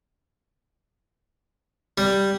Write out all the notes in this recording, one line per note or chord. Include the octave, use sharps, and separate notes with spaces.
G3